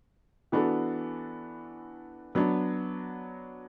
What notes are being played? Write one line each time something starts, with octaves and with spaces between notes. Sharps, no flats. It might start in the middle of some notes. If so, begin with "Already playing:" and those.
E3 B3 D4 F#4 A4
F#3 B3 D4